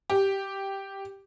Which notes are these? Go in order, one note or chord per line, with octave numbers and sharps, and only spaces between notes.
G4